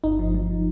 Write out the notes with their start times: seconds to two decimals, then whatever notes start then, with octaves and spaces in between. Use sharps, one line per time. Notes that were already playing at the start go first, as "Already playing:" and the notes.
0.04 G1 D#4
0.19 F3
0.35 F3